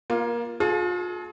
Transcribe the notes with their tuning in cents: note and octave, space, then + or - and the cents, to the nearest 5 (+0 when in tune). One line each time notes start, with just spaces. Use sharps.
A#3 +20 F4 +0
F4 +40 G#4 +40 A5 +0